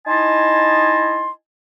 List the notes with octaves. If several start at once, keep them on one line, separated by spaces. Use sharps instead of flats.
D#4 E4 D#5 G#5 A5 C6